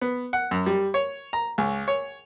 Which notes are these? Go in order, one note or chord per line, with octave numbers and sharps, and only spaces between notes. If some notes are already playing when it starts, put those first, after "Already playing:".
B3
F#5
F#2
G3
C#5
A#5
C#2
C#5